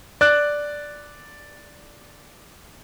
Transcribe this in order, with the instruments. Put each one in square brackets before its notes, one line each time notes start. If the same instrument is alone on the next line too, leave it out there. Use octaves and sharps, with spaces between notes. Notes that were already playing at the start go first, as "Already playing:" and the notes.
[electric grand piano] D5 F#6